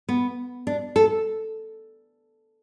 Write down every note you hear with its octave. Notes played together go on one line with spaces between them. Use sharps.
B3
D4
A4